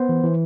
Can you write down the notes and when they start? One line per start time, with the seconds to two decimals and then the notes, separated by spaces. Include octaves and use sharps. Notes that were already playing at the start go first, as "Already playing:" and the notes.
Already playing: B3 C5
0.09 E3
0.24 E3